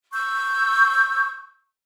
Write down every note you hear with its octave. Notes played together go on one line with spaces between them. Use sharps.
C#6 E6 G6